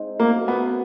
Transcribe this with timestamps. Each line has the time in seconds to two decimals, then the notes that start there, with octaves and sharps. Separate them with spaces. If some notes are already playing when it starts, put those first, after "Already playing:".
Already playing: G#3 C4 D#4
0.19 F#3 A3 A#3 C#4
0.48 B3